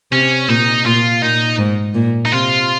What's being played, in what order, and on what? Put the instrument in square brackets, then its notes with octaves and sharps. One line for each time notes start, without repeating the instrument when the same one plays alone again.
[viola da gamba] C3 [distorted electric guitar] C#4
[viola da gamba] A#2 [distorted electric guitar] D#4
[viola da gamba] A#2 [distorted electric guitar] F4
[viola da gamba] A#2 [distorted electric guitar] D#4
[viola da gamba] G#2
A#2
[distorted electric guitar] D#4
[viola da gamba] C3 [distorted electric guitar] F4